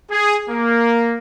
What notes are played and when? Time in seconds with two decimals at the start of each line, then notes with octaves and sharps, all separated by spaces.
0.11 G#4
0.50 A#3